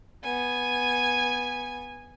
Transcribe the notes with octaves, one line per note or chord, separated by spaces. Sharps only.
B3 G#5